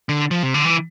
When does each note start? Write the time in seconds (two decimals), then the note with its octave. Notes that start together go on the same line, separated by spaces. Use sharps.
0.09 D3
0.31 F3
0.43 C3
0.54 D3
0.65 E3